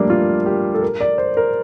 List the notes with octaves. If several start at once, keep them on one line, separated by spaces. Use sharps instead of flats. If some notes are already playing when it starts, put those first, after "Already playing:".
Already playing: F3 G3 A3 A#3 D4
F4
G4
A4
A#4
D5
C5
A#4